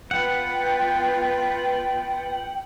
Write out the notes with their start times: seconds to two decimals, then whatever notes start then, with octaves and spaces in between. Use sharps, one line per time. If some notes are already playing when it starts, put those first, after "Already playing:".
0.11 B3 F4 B4 F#5 G5